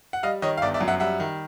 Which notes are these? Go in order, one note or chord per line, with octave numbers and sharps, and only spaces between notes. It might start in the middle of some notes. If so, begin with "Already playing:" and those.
F#5
G3 D#5 F5
D#3 C#5 D#5
F5
G1 D5 E5
D5 E5
F#2
E5 F#5
G3 E5 F#5
D#3